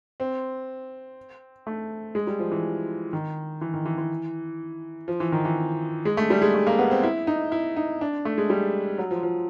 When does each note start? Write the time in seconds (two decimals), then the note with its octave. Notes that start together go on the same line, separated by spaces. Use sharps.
0.20 C4
1.67 A3
2.15 G#3
2.27 G3
2.39 F3
2.52 E3
3.13 D#3
3.61 E3
3.74 D#3
3.86 E3
3.98 E3
5.08 F3
5.20 E3
5.32 D#3
5.45 E3
6.05 G#3
6.17 A3
6.30 G3
6.42 G#3
6.54 A3
6.67 A#3
6.79 B3
6.91 C4
7.03 E4
7.27 D#4
7.52 E4
7.76 D#4
8.01 D4
8.25 A3
8.38 G#3
8.50 G3
8.98 F#3
9.11 F3
9.23 F3